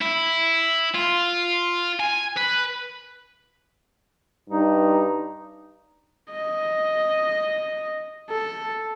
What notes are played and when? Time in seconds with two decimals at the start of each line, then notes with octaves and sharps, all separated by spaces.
0.01 E4
0.95 F4
2.00 G#5
2.37 B4
4.50 G2 D#4
6.32 D#5
8.30 A4